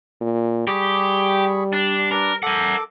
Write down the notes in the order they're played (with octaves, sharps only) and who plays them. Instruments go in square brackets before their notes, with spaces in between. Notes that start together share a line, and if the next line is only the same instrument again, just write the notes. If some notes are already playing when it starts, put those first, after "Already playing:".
[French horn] A#2
[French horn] G3 [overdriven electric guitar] G4 [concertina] G#4 B5 C#6
[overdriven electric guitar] D4
[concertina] D4 B4 D5 [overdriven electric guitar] A#4
[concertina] A4 D6 [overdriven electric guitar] A#4 F#5